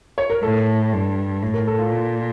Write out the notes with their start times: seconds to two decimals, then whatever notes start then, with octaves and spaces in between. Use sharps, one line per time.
0.18 C#5
0.30 A#4
0.43 A2 A4
0.93 G2
1.42 A2
1.54 A#4
1.67 A4
1.79 F4
1.92 A#2